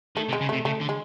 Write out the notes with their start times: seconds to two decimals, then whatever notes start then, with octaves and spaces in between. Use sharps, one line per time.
0.16 D#3 A3
0.29 C3
0.33 G#3
0.41 C#3
0.49 C3 A3
0.65 C#3 A3
0.81 D3
0.89 G#3